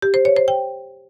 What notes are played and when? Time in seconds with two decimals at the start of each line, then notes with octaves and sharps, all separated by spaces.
0.02 G4
0.14 C5
0.25 C#5
0.36 C5
0.48 G5